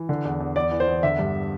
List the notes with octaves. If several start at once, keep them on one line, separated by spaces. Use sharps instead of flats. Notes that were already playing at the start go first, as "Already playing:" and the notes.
Already playing: E3
D3
E2
E2
E2 D5
E3
C5
E2
D3 E5
G2